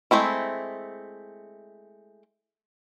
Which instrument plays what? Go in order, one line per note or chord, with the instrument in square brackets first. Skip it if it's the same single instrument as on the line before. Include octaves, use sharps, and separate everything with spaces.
[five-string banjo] G#3 A3 C4 E4